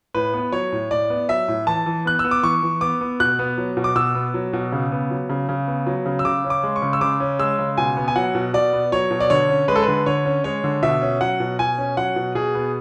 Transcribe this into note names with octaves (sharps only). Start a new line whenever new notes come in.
A2 B4
B3
F#3 C#5
A2
A2 D5
B3
F#3 E5
A2
E3 A5
E3
B3 F#6
E6
B3
D6
E3 C#6
E3
B3 D6
B3
B2 F#6
B3
F#3
B2
D6
B2 E6
B3
F#3
B2
C#3
B3
F#3
C#3
C#3
B3
F#3
C#3
E6
C#3 D6
C#4
D6
G#3
C#6
C#3
E6
C#3 D6
C#4
G#3 E6
C#3
B2 G#5
B3
G#5
F#3 F#5
B2
B2 D5
B3
F#3 C#5
B2
D5
D3 C#5
C#4
G#3 B4
A4
B4
D3
D3 C#5
C#4
G#3 C#5
D3
B2 E5
C#4
F#3 F#5
B2
B2 G#5
C#4
F#3 F#5
B2
B2 G#4
B3